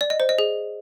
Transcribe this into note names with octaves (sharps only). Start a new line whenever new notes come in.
D5
D#5
C5
D#5
G#4